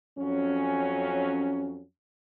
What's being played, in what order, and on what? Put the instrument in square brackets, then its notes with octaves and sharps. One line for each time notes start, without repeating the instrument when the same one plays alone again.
[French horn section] F2 F#3 C#4